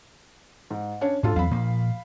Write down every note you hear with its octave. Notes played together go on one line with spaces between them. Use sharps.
G#2
C#4 D4 C#5
G#2 D4 F4 A4
E2 F#3 C4 F5 B5
A#2 F3 A#3